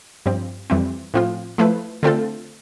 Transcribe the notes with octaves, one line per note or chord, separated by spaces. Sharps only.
G2 F3 C4
F2 E3 G3 C4
A2 F3 C4 F4
F3 A3 E4 B4
D3 A3 C4 F4 A4